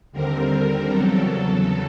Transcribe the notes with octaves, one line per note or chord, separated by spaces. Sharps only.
D#2 D3 G3 C4 A#4
E2 C#3 F#3 A4